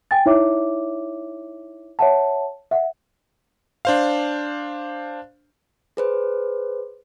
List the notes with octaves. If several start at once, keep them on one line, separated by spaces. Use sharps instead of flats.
G5 G#5 A6
D#4 E4 C#5 E5 D6
C#5 E5 F#5 A5
E5 F#5
D4 C5 F5
G#4 B4 C5